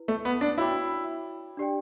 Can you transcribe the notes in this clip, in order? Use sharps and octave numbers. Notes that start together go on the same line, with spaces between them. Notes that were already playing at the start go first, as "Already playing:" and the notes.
Already playing: E4 B4
A3
B3
D4
E4 F#4 C#5 G5 B5 D6
D4 G4 D5 G5